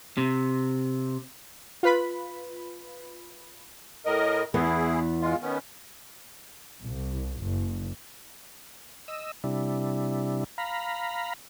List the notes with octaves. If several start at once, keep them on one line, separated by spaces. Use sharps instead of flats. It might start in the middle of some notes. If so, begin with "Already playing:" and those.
C3
F4 B4 B5
A2 A#4 D#5
E2 E3 B3 E4 G#4
G#3 F4
D#3 B3 C#4
C2
F#1
D#5 E6
C3 G3 D4 E4
F5 A#5 B5